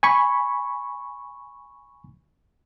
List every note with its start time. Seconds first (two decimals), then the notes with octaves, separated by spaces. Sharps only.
0.03 G#5 B5 C#6